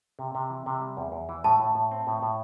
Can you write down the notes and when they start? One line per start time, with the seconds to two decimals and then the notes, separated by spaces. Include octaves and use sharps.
0.19 C3
0.35 C3
0.50 E3
0.66 C3
0.81 G3
0.97 E2
1.12 E2
1.29 E3
1.44 A2 A5
1.60 A2
1.75 A2
1.91 C4
2.07 A2
2.22 A2